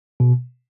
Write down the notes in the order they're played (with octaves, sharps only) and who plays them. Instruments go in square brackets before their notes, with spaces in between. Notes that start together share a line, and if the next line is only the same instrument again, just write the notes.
[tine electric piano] B2